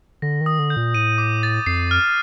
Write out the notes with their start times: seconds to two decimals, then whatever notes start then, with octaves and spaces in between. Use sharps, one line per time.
0.22 D3 A#6
0.41 D#3
0.46 D#6
0.59 D3
0.70 G6
0.77 A#2
0.95 A2 D#7
1.18 D6
1.43 A6
1.66 F2 C7
1.91 F6